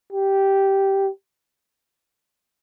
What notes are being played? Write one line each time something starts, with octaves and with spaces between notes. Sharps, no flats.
G4